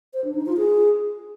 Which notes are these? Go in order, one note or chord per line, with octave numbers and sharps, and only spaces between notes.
C5
D4
D#4
F4
G#4